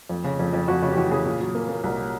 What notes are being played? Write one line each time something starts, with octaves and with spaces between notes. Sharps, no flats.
F2
C#3
F2
F2
F2 F#4
C#3 F#4
G4
E3 F#4
C#3 G#4
A#2
F#3
A#3
A#3
C2